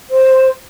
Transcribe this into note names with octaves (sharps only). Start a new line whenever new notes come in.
C5